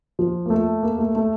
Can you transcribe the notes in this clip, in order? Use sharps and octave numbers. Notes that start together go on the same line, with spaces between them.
F3
A#3
A3
A#3
A3
A3